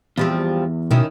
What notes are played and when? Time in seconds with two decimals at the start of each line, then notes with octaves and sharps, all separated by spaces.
0.18 E2 F3 G3 C4
0.91 B2 D#3 C#4 E4